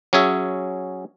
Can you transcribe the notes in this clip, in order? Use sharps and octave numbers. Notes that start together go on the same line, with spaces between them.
F#3 C#4 G#4 E5